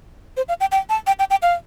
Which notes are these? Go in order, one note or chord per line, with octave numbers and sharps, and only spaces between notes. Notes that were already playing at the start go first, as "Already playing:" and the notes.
C5
F5
G5
G5
A5
G5
G5
G5
F5